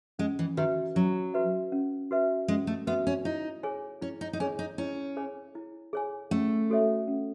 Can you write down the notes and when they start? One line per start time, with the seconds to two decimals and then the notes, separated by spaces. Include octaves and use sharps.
0.19 G#3 C#4
0.39 E3
0.57 D#3 F#4 B4 E5
0.95 F#3 C#4
1.34 F#4 B4 E5
1.72 C#4
2.11 F#4 B4 E5
2.48 G#3 C#4
2.67 A3
2.87 B3 F#4 B4 E5
3.07 C#4
3.25 D#4 E4
3.63 G#4 C#5 G#5
4.01 C#4 E4
4.21 D#4
4.33 D#4
4.40 C#4 G#4 C#5 G#5
4.59 D#4
4.78 C#4 E4
5.17 G#4 C#5 G#5
5.55 E4
5.93 G#4 C#5 G#5
6.31 A3 C#4
6.70 F#4 A4 C#5 E5
7.08 C#4